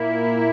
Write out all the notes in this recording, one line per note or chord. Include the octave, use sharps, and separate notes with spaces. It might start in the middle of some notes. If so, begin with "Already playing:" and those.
Already playing: A#2 A#3 E4